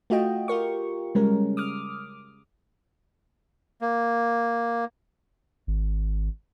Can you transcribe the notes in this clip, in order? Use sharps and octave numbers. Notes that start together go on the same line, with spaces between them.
A3 F4 F#4 D#5 G5
F4 G4 A#4 C#6
C#3 G3 G#3 C#4 A#4
D6 D#6 F6
A#3
G#1